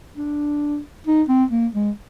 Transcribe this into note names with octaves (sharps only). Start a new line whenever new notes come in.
D4
D#4
C4
A#3
G#3